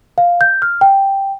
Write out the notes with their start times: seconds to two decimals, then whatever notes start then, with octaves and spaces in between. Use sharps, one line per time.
0.18 F5
0.41 G6
0.62 F6
0.81 G5